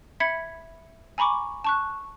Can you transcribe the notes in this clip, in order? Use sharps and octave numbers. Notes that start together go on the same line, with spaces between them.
E5 B5 G#6 B6 C#7
G#5 A#5 B5 C#6 D6
A5 C#6 F#6